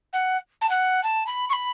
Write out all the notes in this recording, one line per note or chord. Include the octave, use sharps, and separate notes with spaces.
F#5
A5
F#5
A5
B5
C#6
B5